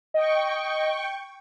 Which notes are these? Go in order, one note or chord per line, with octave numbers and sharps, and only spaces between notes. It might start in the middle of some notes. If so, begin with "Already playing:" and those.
D#5 G5 C#6